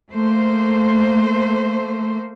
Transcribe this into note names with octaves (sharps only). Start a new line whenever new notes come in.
A3 A#3 C5